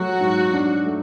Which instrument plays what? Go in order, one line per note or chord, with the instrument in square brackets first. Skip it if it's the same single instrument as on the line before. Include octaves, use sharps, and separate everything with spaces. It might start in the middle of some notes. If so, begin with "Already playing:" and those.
Already playing: [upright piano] F#3 A3 [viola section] F#4
[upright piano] G#2
D4
A3